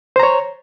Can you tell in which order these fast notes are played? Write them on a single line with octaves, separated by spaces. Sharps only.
C5 A#5 C#5